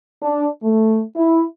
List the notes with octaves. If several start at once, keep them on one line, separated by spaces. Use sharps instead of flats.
D4
A3
E4